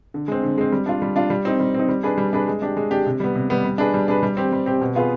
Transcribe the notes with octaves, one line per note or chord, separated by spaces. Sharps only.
D3
G#3 C4
D3
G#3 C4
G3
D4 F4
G3
D4 F4
G3
C4 D#4
G3
C4 D#4
G3
D4 G#4 B4
G3
D4 G#4 B4
G#3
D4 G4
G#3
D4 G4
C3
G3 B3
C3
G3 B3
G3
D4 G#4 B4
G3
D4 G#4 B4
G3
C4 G4
G3
C4 G4
B2
B3 F4 G#4 B4